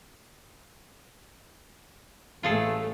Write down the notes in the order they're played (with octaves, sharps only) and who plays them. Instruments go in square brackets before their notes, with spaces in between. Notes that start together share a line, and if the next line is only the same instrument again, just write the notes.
[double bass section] A1 A3 [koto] F4 G#4 A4